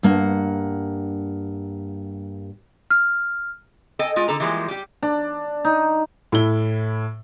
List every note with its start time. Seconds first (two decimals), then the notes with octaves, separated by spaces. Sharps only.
0.03 G2 A#3 F#5
2.90 F6
3.99 A4 D#5 G5 G#5
4.16 G#3 F4
4.28 D3 A4 A#5
4.40 E3 F3 G3 G#3 A#3
4.68 G3 G4
5.03 D4
5.65 D#4
6.32 A2 E4 G7